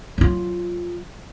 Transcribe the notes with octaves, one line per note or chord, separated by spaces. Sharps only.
F#3 F4